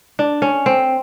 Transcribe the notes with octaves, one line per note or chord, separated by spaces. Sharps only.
D4
C#4
C4